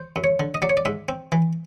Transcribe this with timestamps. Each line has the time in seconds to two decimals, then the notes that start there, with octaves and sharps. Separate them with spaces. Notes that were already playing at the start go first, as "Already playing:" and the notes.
Already playing: C5
0.16 F#2
0.24 C#5
0.40 D3
0.54 D#5
0.62 F#3 D5
0.70 C#5
0.77 D5
0.85 G#2 E5
1.09 C4
1.32 E3